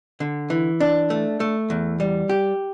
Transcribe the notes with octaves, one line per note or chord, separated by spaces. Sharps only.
D3
E3
D4
A3
A3
E2
G3
G4